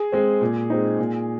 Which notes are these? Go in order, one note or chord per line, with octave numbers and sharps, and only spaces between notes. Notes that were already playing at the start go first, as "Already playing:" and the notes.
Already playing: G#4
G#3 C4
A#2
G#3 C4 D#4
A#2